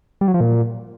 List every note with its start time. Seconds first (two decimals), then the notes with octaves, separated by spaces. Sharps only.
0.21 G3
0.28 F#3
0.34 F3
0.40 A#2